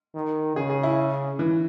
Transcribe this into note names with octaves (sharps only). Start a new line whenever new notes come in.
D#3
C#3 G#4
G#4
E4
E3